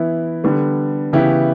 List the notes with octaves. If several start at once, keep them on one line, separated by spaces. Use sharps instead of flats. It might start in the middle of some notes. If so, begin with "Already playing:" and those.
Already playing: E3 B3 E4
D3 G3 B3
C#3 E3 B3 E4 G4